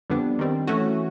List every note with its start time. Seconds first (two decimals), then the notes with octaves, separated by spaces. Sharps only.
0.10 F2 D3 G3 B3 D4
0.39 D#3 G3 C4
0.67 E3 A3 C#4 F#4